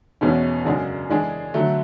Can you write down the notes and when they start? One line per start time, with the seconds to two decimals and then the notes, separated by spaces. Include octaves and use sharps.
0.21 E2 B2 G#3 C#4
0.65 F#2 C#3 G#3 D4 G#4
1.09 E3 G#3 D4 G#4
1.54 D3 F#3 A3